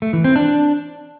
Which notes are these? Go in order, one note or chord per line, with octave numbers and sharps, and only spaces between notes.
A3
E3
C4
D4